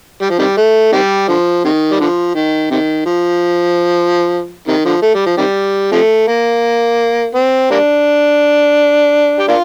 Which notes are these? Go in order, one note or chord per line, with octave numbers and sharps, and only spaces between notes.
G3
F3
C3 D#3 G3
A3
C3 D#3 G3
D3 F3
C3 D#3
G3
D3 F3
D#3
C3 D#3
F3
C3 D#3
D3 F3
A3
G3
F3
C3 D#3 G3
C3 F3 A3
A#3
C4
G3 A#3 D4
G4
A#3 D4 F4